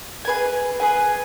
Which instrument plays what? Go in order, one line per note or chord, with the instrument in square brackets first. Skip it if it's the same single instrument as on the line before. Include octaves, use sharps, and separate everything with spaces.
[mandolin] G#4 B4 G#5
G#4 B4 G#5